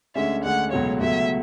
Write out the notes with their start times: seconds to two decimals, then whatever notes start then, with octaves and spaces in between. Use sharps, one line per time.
0.16 D2 D3 G#3 C#4 E5
0.44 D2 D3 G#3 C#4 F#5
0.72 C#2 B2 F#3 A3 C#5
1.01 C#2 B2 F#3 A3 E5